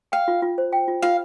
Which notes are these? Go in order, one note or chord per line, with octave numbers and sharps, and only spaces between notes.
F5 G5
F4
F4
C5
G5
F4
F4 F5